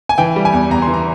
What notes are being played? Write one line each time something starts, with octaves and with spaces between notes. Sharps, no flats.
G#5
E3 G5
G3
G#5
E2
E2 A#5
C6
E3
A#5